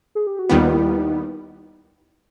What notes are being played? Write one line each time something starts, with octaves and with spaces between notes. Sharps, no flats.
G#4
G4
F#4
D#2 D#3 G3 B3 F4
E4
D#4